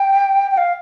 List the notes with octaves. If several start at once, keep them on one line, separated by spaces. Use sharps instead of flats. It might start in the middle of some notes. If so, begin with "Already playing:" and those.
Already playing: G5
G5
F5